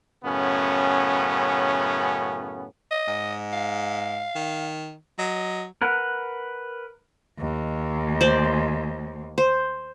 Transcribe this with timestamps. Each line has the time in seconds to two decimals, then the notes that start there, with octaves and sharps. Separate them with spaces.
0.25 F#2 A2 C#3 B3 C#4
2.91 D#5
3.08 G#2
3.53 F5
4.36 D#3
5.19 F#3 D#5
5.82 A#4 B4 F#5
7.39 D#2
8.21 C5 D5
9.38 C5